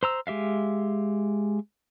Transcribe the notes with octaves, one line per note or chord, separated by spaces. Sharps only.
C5 A#5 E6
G#3 G4 E5 F5